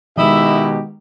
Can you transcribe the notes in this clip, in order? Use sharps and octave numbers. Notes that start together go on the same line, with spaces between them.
B2 D#3 G#3 D#4 E4 G4 D#5 E5